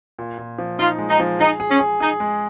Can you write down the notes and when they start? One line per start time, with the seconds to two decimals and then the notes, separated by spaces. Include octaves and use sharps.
0.19 A#2
0.38 A#2
0.59 F3
0.79 D#4 F4
0.99 G#3
1.09 D#4
1.20 F3
1.39 D#4 G#4
1.60 G#4
1.69 C#4
1.80 G#4
2.00 D#4 G#4
2.20 G#3